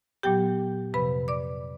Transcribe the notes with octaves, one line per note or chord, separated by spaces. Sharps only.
A#2 F#3 B3 G4 G5
F2 C3 F3 B4 B5
D5 D6